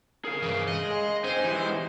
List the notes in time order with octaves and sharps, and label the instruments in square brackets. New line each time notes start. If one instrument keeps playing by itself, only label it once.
[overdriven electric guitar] G#4 F5 [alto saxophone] A#4
[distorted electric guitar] G2 E3
[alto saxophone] G#3 [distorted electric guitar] D#5
[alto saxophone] G#3
[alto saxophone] C4 [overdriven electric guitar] D#4 G#4 [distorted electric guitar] C5
[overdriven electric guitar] E3 G#3 [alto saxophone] G4